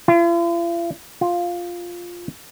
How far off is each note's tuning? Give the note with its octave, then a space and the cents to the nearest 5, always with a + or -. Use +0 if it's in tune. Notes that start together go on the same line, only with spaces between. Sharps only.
F4 -45
F4 +5